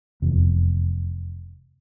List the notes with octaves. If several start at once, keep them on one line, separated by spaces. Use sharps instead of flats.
F1 E2